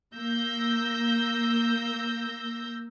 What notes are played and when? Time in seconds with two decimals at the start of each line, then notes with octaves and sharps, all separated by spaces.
0.15 A#3 E6 G6 A#6